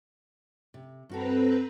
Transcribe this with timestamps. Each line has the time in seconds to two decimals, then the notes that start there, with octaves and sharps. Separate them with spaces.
0.74 C3
1.09 G2 C4 F#4 A4 B4 A#5